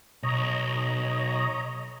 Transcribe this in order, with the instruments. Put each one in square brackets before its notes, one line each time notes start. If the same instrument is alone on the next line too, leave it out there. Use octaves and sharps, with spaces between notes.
[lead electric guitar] B1 [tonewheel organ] C#5 D#5 A#5